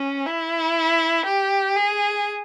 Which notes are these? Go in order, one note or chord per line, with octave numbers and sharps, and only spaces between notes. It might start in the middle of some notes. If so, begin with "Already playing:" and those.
Already playing: C#4
E4
G4
G#4